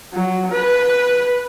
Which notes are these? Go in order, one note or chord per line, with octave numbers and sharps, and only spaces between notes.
F#3
B4